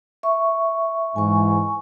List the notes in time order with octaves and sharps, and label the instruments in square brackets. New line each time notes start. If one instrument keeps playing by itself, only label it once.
[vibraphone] E5 C#6
[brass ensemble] G#2 E3 [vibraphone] G#5 C#6